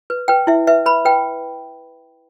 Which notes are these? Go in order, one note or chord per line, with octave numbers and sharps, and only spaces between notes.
B4
B4 G5
E4 E5
B4 E5
B4 B5
B4 G5